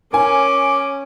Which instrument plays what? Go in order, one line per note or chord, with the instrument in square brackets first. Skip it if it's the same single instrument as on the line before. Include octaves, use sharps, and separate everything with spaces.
[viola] C#4 [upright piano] A#4 G#5 [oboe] D6